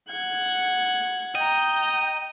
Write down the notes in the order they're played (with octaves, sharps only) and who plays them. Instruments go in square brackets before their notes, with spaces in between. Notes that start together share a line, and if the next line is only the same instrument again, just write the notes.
[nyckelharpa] F#5 [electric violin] G#6
[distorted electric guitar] D#5 [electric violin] G5 A#5